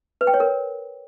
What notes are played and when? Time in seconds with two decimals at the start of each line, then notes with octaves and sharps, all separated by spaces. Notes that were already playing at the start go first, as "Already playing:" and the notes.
0.21 B4
0.27 G5
0.34 C#5
0.40 A#4